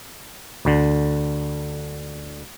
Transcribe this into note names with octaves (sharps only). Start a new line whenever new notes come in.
D2 D3